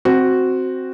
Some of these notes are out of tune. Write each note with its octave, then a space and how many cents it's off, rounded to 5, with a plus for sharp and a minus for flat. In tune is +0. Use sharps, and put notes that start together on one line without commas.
C4 +0 F#4 +0